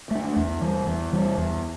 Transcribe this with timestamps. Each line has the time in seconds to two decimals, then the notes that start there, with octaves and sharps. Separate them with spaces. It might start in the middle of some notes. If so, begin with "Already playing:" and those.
0.11 A3 D4
0.36 E2
0.61 E3 G3
0.87 E2
1.13 E3 G3
1.38 E2